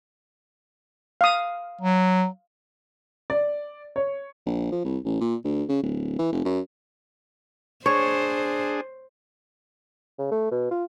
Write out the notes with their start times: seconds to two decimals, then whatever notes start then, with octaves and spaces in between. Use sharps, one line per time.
1.21 F5 D#6
1.81 F#3
3.30 D5
3.96 C#5
4.46 A#1
4.71 F3
4.84 C2
5.05 A1
5.20 A#2
5.44 D2
5.69 C#3
5.83 D1
6.18 E3
6.32 F1
6.45 F#2
7.86 D4 G#4 C5 C#5
10.19 C#3
10.31 A3
10.51 B2
10.71 F4